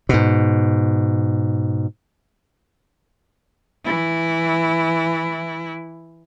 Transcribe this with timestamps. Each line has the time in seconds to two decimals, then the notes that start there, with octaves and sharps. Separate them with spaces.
0.09 G#2 B2
3.85 E3 E4